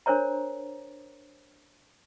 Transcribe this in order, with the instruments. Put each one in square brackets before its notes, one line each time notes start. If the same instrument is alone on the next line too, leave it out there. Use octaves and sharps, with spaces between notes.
[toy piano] D4 A#4 C5 C#5 A#5